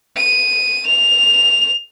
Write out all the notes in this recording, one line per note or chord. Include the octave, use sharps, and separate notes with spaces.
D#7
F7